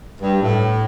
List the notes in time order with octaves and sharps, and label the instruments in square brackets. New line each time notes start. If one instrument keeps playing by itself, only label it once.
[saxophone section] G2
A2